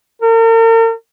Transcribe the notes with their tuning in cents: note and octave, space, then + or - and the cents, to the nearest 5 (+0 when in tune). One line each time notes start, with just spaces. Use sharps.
A#4 -45